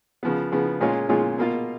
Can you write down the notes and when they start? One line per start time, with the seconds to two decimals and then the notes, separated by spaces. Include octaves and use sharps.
0.23 C#3 F3 B3
0.52 C#3 F3 B3
0.81 A#2 G#3 C#4 F4 G#4
1.09 A#2 G#3 C#4 F4 G#4
1.38 B2 A#3 F4